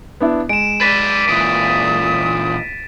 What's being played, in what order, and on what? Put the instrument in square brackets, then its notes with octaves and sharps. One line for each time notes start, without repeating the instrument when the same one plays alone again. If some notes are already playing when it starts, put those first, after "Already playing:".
[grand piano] B3 D4 E4
[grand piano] G#3 [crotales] D7 E7
[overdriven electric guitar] B4 D5 [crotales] A6 B6 D#7
[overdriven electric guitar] A#2 E3 [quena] D#6